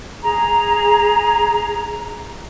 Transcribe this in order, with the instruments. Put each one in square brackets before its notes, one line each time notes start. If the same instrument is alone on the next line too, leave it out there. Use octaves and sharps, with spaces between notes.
[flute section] G#4 A#5